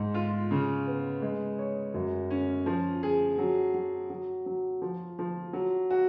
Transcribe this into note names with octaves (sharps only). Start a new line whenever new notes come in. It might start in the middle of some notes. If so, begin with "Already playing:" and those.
Already playing: G#2
F4
C#3
B3
G#3
C#5
F#2
C#4
F3
G#4
F#3
F#3
F#3
F#3
F3
F3
F#3
F#4